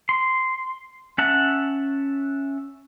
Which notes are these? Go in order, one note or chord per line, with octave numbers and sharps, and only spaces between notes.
C6
C#4 E5 F#5 A5